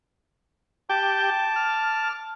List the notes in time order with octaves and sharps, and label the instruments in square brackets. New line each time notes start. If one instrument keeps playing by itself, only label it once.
[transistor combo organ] G4 G5 [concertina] A5 D6
[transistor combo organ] F6